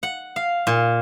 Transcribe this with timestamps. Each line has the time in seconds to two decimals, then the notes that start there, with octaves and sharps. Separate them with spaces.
0.03 F#5
0.36 F5
0.67 A#2